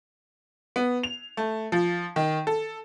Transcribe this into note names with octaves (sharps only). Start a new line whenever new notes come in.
B3
F7
A3
F3
D#3
A4